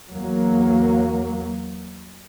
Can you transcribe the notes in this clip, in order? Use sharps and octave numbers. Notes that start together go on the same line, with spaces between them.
E2 F#3 A#3